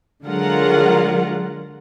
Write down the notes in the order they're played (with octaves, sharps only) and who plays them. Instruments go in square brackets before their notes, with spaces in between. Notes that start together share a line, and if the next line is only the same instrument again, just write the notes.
[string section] D3 F#3 G#3 F4 A#4 F#5